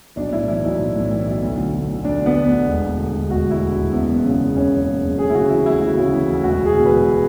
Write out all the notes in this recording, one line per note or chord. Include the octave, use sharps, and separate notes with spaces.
B1 D4
A2 E4
E3 E4
B1
B1
A2
E3
B1
D2
D3
D2
D3
D2 D4
D3
B3
D2
D3
E1
D2
D3
E1
E1 F#4
D2 E4
D3
E1
F#1 B3
E2
C#3
F#1
F#1 C#4
E2
C#3
F#1
D2 G#4
E4
C#3 F#4
E3 E4
D2 E4
D2 F#4
C#3
E3
D2
E1 F#4
E2
G#4
B2
B4
E1